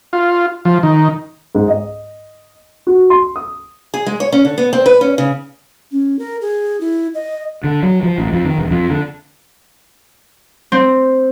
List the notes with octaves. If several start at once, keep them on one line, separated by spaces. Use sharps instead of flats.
F4
F3
D#3
G#2
D#5
F#4
C6
D#6
G#4
G#3
C#5
C#4
D3
B3
C4
B4
C#4
C#3
C#4
A#4
G#4
E4
D#5
D3
F#3
F3
A1
F2
D#3
E1
F2
D3
C4